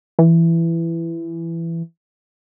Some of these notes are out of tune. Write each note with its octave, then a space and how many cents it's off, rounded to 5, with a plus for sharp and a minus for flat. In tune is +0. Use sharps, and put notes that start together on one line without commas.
E3 +15